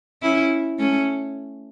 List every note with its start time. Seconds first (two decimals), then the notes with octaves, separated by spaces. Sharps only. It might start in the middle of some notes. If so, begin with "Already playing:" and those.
0.22 C#4 E4
0.79 A3 C#4